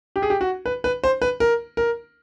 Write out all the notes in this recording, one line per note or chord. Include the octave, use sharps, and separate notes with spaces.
G4
G#4
G4
F#4
B4
B4
C5
B4
A#4
A#4